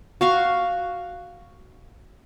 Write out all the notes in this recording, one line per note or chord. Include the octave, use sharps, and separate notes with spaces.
F#4 F5 C#6